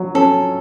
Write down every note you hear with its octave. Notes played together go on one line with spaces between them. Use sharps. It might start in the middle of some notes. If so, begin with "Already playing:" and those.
Already playing: F#3
C#4 A4